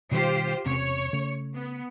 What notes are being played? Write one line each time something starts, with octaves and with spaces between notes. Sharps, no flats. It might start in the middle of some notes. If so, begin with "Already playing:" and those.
B2 D#3 G3 F4 G4 C5
E1 C3 C#4 C#5
C#3 A3
B3